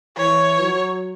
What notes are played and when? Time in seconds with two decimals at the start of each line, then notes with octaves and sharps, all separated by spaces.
0.18 E3 C#5
0.61 F#3